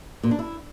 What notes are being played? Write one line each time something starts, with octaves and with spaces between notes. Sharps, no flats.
A#2
D4
E4